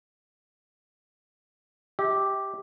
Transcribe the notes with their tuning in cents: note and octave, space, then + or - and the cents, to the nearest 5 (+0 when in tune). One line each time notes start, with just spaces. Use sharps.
G4 +0 E5 -40